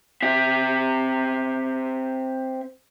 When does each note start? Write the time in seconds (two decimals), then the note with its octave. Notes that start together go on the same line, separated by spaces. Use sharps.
0.22 C4 E5